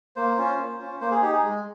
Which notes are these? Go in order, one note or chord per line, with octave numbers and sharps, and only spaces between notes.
A#3 C5
C#4 F4
A#3
C#4 F4
A#3 C5
G#4
D#4 G4
G#4
G#3